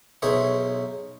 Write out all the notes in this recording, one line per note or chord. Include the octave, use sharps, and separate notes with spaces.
B1 B2 C#4 G#4 C5 E5